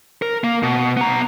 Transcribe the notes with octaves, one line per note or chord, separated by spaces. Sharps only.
A#4
A#3
B2
B3 A#5